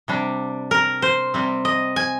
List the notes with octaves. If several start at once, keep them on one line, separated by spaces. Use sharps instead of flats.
C3 G3 D4
A#4
C5
C3 G3 C4
D#5
G#5